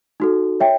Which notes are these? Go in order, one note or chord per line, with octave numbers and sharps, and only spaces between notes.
D#4 F#4 A4
C#5 E5 G5